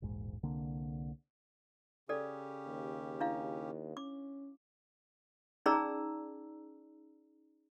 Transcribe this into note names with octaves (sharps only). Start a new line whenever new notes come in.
E1 A#1 G#2
C2 D3 A#3
C#3 C#4 G4 A4 D5
D#2
D4 E4 F5
C#4 D6
C#4 D#4 G#4 D5 A#5 E6